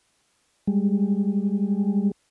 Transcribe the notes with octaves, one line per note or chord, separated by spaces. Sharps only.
G3 G#3